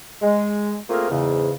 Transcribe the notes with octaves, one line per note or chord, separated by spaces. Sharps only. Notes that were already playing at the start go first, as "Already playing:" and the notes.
G#3
A3 A#3 C4 F4 G#4 A#4
E2 G#2 C#3